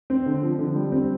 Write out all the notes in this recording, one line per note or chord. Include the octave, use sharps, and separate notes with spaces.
C4
D3
F3
D3
G3
C4